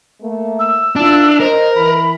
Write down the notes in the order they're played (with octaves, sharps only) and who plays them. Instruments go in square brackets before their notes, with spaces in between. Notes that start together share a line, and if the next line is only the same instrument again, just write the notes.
[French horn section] A3 A#3
[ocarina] E6
[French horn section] D#3 E4 F4 [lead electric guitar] D4
[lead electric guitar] A#4 [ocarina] C5 [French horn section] D#5
[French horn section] E3 [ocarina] B5